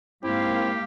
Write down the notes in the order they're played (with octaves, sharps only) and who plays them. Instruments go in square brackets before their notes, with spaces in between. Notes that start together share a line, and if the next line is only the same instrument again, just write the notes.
[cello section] G#2 A#3 F5 [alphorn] C4 [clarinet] E4 [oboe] G4